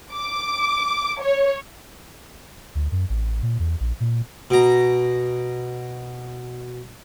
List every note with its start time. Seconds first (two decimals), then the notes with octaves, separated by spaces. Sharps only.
0.13 D6
1.20 C#5
2.75 D2
2.92 F#2
3.09 A1
3.42 A#2
3.59 E2
3.80 A#1
4.00 A#2
4.50 B2 A#5